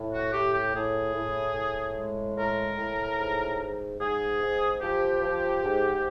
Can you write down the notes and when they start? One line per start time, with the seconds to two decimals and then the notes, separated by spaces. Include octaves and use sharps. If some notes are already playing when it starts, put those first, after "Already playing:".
Already playing: A2
0.13 F#4
0.32 A2 G4
0.53 G4
0.73 A2 G#4
1.14 A2
1.55 A2
1.95 G#3
2.37 A2 A#4
2.77 A2
3.19 G#2
3.59 G#2
4.00 G#2 G#4
4.40 G#2
4.81 F3 G4
5.22 F3
5.63 G#2